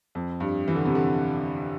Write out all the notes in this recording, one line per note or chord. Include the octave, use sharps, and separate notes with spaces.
F2
G2
E3
D3
C3
D3